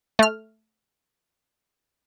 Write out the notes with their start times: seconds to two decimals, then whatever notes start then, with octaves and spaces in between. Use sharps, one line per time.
0.19 A3 F6